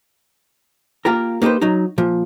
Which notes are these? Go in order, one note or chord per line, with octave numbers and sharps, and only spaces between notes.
A#3 F4 G4 A#4
A#3 D#4 G4 B4 C5
F#3 D#4
A#2 F3